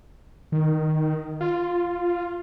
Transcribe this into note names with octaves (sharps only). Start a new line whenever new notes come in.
D#3
F4